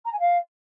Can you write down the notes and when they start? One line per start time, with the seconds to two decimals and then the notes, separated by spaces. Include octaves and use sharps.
0.05 A#5
0.12 G#5
0.20 F5